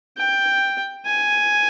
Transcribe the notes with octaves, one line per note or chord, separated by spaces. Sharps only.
G5
G#5